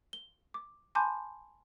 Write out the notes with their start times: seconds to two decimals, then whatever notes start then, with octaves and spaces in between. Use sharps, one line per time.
0.13 G7
0.54 D6
0.95 G#5 A5 B5 C6 D6 G6